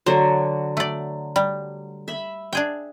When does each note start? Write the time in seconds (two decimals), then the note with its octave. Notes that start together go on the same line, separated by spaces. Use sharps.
0.06 D3 F#3 C5
0.77 A3 D5
1.36 G3
2.08 E5 B5
2.53 D4 G#4 G5